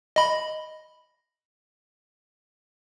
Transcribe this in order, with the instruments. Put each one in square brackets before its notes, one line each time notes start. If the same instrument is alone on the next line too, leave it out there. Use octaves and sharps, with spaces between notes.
[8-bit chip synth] D#5 B5